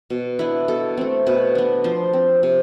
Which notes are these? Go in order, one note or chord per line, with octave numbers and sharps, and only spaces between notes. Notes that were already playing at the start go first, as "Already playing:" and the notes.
B2
B3 D4 E4
B2 A4
A3 C4
B2 B4
B3 D4
F3 C5
C4
C3